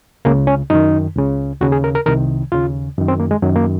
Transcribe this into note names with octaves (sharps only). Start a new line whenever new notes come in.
C#2 C#3 A#3
C#4
F#2 D#3 D#4
C#2 C#3
D#2 C#3 F#4
G#4
A#4
A#4
C2 C3 D#3 A#4
D#2 C#3 F4
F#2 D#3
C4
A#3
G#3
F#2 D#3 F#3
A#3